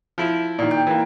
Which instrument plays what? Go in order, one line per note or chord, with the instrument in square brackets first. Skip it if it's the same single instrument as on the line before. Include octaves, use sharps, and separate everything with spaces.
[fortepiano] F3 E4
A#2 D#3
[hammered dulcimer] G5
[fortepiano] E3 A#3